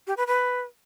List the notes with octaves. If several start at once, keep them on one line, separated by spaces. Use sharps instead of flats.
G4
B4
B4